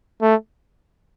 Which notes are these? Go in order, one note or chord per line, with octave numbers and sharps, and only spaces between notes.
A3